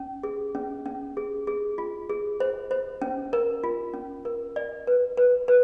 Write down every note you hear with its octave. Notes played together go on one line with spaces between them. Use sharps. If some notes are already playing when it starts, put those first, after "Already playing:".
Already playing: C#4
G#4
C#4
C#4
G#4
G#4
F4
G#4
C5
C5
C#4
A#4
F4
C#4
A#4
D5
B4
B4
B4